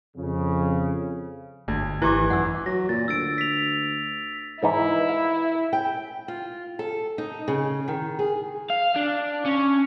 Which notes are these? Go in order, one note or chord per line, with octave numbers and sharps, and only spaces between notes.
F2 C#3
G1 D2
G#1 E3 E4 G4 D6
F#2 F#5 E6
F#3 A#6
A#2 A6
D2 E6 A6 D7
B6 F7
G#2 E3 D#4 E4
F5
G5
F4
A4
D#4
C#3
D#3
G#4
F5
D4
C#4